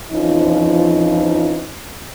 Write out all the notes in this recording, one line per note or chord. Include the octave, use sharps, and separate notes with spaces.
F2 E3 F3 C#4 D#4